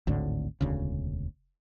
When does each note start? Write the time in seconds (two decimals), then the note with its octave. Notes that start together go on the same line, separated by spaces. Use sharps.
0.07 G#1 D2 A2 D3
0.61 E1 D2 C#3